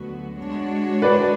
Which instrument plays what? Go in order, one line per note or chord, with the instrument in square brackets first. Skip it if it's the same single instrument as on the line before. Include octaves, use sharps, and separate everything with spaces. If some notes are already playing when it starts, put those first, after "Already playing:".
Already playing: [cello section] D2 D3 F#3 B3 F#4
G#3 D4 F#4 C#5
[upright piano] B4 D5